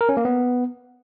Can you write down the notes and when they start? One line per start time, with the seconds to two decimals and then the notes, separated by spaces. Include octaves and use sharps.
0.01 A#4
0.09 C#4
0.17 A#3
0.25 B3